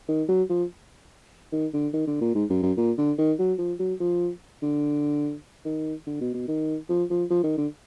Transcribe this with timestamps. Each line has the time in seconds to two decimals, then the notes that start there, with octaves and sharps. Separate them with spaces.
0.08 D#3
0.29 F#3
0.49 F3
1.52 D#3
1.74 D3
1.94 D#3
2.07 D3
2.21 A#2
2.35 G#2
2.50 F#2
2.63 F#2
2.77 A#2
2.98 D3
3.18 D#3
3.39 F#3
3.59 F3
3.79 F#3
4.00 F3
4.62 D3
5.65 D#3
6.07 D3
6.21 B2
6.34 B2
6.48 D#3
6.89 F3
7.10 F3
7.30 F3
7.44 D#3
7.57 D3